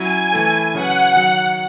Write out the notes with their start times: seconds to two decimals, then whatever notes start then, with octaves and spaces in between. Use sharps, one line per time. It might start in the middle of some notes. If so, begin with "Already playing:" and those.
Already playing: F#3 C#4 E4 G#5
0.33 E3 A3 E4 A4
0.74 C#3 F#3 C#4 F#4 B4 F#5
1.16 D#3 F#3